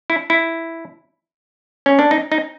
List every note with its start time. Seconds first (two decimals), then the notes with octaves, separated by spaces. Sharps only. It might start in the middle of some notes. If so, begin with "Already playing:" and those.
0.10 E4
0.30 E4
1.86 C#4
1.99 D4
2.11 D#4
2.32 D#4